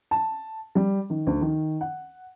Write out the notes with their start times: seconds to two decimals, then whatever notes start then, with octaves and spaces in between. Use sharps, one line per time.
0.11 A5
0.75 G3
1.10 D#3
1.27 D2
1.41 D#3
1.81 F#5